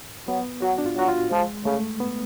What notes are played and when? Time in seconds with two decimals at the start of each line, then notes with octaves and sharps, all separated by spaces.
0.28 F#3 B3
0.62 F#3 F#4
0.78 D4
0.86 F4
0.97 F#3 F#4
1.08 F4
1.31 F3 G#3
1.65 C#3 A3
2.00 B3